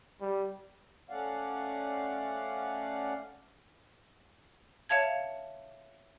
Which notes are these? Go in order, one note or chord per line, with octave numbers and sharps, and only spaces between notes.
G3
A3 C#4 D5 F5 F#5
C#5 E5 F5 A5 G#6